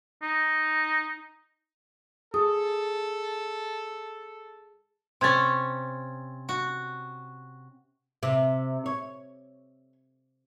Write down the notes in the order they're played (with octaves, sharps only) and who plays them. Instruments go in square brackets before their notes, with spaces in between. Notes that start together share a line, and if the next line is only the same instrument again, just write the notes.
[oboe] D#4
[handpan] G#4 [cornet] A4 [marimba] D#6
[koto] C3 C#4 [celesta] C6 G#6 A6
[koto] F#4
[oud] C3
C#5